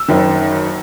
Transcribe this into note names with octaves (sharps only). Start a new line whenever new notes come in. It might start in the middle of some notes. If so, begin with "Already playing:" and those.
Already playing: E6
F#1 F#2 D#3